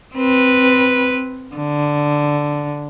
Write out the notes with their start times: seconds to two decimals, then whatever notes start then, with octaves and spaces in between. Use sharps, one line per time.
0.16 C4 B4
1.55 D3